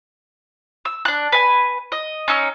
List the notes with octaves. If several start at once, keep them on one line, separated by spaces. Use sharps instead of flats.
E6
D4 F#6
B4 G#5
D#5
C#4 D#4 E6